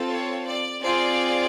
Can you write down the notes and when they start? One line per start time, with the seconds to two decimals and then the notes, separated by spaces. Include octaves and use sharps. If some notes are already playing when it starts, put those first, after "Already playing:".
Already playing: C4 F4 A4
0.09 C#5
0.45 D5
0.82 C4 F4 G#4 D5